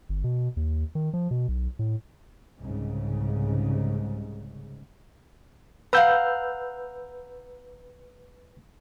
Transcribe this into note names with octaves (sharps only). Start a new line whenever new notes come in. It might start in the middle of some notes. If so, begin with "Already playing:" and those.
G1
B2
D#2
D#3
F3
B2
B1
A2
C2 G#2 C#3
B4 F5 F#5 A#5 E6 G6